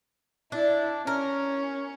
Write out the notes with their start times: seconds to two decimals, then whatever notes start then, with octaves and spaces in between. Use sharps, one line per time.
0.52 D4 E4
1.07 C#4 A#4